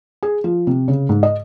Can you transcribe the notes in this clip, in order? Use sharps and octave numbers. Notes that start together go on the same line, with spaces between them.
G#4
F3
C3
C#3
G#2
D#5